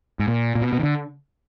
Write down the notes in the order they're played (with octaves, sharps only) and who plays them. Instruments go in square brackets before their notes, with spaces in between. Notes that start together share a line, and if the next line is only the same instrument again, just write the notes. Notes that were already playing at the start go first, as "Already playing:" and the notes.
[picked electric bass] G#2
A#2
A#2
B2
B2
D#3
D3